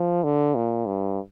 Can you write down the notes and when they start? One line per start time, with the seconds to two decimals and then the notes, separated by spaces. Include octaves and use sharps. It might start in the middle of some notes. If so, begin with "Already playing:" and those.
Already playing: F3
0.24 D3
0.55 A#2
0.86 G2